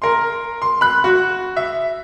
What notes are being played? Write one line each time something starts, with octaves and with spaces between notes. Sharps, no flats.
A#4 C6
C6
B5 F#6
F#4
E5